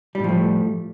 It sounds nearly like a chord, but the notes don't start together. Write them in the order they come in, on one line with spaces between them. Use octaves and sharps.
G3 A2 F3 A3